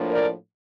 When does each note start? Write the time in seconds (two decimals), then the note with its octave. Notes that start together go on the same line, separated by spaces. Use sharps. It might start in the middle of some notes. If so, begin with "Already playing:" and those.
Already playing: A2 F3 A#3 D4
0.11 A#4 D5